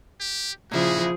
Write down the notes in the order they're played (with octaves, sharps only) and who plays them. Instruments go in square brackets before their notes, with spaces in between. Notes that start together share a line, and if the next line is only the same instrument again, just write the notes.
[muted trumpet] G4
[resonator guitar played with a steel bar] A#2 C#3 E4 [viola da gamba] F3 G#4 [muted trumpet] F#4